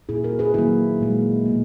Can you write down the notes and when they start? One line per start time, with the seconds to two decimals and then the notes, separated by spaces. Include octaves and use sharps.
0.09 A#2 A#3 E4 G#4
0.24 F#4 A#4
0.39 G#4 B4
0.54 D#3 F#3 A#3 E4 G#4
1.01 A#2 G#3
1.46 B2 A#3